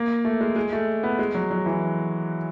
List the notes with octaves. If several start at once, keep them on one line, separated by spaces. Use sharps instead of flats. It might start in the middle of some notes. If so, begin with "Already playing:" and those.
Already playing: A#3
A3
G#3
G#3
A3
B3
G#3
F#3
F#3
E3